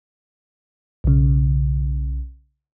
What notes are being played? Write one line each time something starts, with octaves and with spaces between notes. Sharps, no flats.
B1 C#3